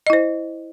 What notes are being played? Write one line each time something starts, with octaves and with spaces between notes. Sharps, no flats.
E4 C5 D#5